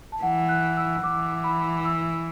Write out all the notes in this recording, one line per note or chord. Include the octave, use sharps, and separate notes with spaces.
A5
E3 F#5
F#6
E6
E3 D6
B5
E6